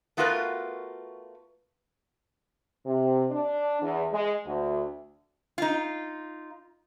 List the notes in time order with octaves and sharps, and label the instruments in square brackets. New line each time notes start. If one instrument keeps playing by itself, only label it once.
[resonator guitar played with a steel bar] A3 B3 F4 F#4 A#4 B4
[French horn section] C3
D4
E2
G#3
D2
[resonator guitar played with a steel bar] D#4 F4